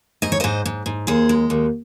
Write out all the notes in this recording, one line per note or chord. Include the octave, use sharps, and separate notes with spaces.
G#2 D#5
C#5
G#2 C5 D#5
G#2
G#2
D#2 G#4 C5
G#3
D#2